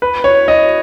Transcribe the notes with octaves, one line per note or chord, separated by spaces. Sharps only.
B4
C#5
D#5